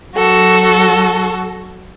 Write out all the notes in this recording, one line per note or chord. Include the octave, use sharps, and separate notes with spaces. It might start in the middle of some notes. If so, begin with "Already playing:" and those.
F#3 F#4 A4